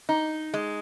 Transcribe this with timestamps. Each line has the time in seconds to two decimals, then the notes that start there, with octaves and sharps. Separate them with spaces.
0.09 D#4
0.54 G#3